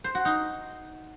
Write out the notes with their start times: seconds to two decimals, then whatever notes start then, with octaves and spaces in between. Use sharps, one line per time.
0.04 C5
0.15 F#4
0.25 D#4